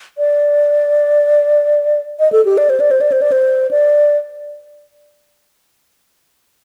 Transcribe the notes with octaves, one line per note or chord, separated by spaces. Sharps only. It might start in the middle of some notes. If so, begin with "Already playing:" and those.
D5
D#5
A4
G4
D5
C5
D5
C5
D5
C5
D5
C5
D5